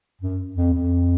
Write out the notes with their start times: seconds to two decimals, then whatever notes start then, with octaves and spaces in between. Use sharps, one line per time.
0.22 F#2
0.56 F2
0.73 F2